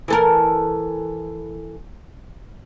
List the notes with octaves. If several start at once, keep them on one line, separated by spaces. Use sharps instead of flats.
E3 A4 A#4